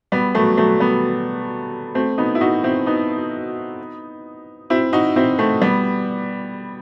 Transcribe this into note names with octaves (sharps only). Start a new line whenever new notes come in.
G3 B3
F#3 A3
F#3 A3
G3 B3
A3 C4
B3 D#4
E4
D#4 F#4
C4 E4
B3 D#4
C4 E4
D#4 F#4
C4 E4
A3 C4
G3 B3